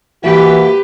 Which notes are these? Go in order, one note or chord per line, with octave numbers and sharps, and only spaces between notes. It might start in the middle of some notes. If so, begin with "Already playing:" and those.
E3 A#3 F#4 G4 B4